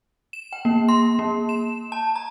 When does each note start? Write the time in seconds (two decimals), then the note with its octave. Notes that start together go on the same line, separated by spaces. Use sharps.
0.33 E7
0.53 G5
0.65 A#3
0.89 C6
1.19 A#3
1.49 E7
1.92 A5
2.16 A#5